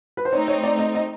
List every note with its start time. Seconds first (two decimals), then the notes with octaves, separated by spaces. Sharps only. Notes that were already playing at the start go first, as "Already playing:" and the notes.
0.17 B4
0.25 C5
0.32 A3 C4 D#4 C#5
0.48 C#5
0.63 D5
0.79 D#5
0.95 D#5